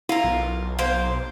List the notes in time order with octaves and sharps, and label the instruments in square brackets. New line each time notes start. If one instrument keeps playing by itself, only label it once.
[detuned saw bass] E4 [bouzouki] F4 A#4
[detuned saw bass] B1
[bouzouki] A#3 C5